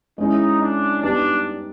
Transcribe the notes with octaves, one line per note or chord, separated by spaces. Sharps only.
G#3 C#4 D#4 E4
D4
G3 B3 D4 D#4